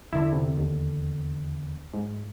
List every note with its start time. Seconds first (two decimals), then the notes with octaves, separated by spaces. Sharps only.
0.13 E2 D3 D4 E4
0.33 C3
0.57 D#2
1.94 G#2